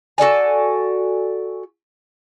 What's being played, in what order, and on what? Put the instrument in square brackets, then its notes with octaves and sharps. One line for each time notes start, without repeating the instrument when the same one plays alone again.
[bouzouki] F#4 A4 D5 G#5